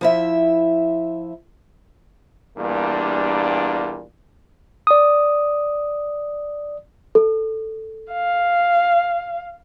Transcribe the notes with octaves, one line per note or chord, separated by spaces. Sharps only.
F3 E4 E5
E2 G2 A#2 G3 A#3 D4
D5 D#6
A4
F5